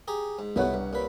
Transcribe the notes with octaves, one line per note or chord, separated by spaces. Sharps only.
G4 G#4 A#5
G#2
C2 B2 A3 B3 C#5 F#5
G2
A#2 B4